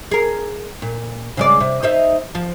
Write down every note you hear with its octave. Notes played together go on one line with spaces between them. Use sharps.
G#4 A#4
A#2
C#3 G#3 D5
C3
D#4 C5 E5
F3